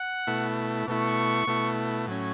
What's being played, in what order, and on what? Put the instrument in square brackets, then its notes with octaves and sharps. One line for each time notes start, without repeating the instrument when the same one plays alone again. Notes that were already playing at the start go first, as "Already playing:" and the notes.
Already playing: [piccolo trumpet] F#5
[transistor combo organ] B2 A3 E4
[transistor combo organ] B2 A3 E4 [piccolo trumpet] C#6
[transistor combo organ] B2 A3 E4
A2 F#3 C#4